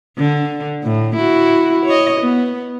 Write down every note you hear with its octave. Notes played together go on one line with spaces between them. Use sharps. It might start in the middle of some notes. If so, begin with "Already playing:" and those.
D3
A2
E4 F#4
C#5 D#5
B3